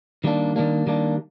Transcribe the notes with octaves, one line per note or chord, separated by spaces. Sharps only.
D#3 G3 A#3 D4
D#3 G3 A#3 D4
D#3 G3 A#3 D4